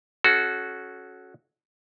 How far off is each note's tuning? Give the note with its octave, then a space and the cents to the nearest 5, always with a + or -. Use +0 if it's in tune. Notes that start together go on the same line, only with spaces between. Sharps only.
C#4 +0 F#4 +0 A4 -25